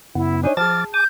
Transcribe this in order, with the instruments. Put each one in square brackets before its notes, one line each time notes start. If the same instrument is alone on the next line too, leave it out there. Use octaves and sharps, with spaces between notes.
[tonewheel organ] F#2 C#3 B3 [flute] E4
[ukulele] D4 D#4 C#5 [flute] G#5
[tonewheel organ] F3 D6 A6 [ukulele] G#4 G5 A5 [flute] F6
[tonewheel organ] G#5 D6 [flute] G6